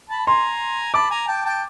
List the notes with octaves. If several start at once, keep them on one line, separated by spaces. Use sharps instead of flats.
A5 B5
G#5 A#5 C6
A5 B5 D6
G#5 A#5
G5 A5
G5 A5